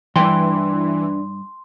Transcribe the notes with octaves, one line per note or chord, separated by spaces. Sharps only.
G2 E3 D4 G5 C6